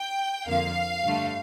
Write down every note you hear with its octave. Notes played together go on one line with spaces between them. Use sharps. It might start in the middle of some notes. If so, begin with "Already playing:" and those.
Already playing: G5
F2 D3 F3 A#3 F5
G2 D3 A3